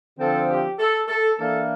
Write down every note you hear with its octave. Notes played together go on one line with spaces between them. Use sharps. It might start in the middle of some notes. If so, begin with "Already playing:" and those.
D3 F3 C4 A4
G4
A4
A4
E3 A#3 D4 A4